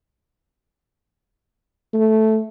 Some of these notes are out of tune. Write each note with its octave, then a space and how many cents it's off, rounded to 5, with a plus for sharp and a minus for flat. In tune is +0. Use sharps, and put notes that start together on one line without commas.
A3 -5